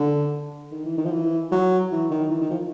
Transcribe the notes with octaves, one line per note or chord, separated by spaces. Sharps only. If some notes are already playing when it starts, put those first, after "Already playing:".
Already playing: D3
D#3
E3
D#3
F3
E3
F#3
E3
D#3
E3
D#3
F3